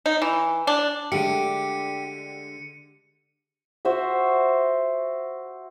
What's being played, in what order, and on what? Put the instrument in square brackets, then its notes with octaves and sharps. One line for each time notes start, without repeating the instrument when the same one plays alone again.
[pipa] D#4
E3
D4
[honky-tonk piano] D3 G#3 A3 [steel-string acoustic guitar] G4 [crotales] C#7 D#7
[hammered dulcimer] F#4 C5 E5 F#5